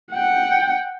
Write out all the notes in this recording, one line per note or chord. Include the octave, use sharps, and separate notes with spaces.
F#5 G5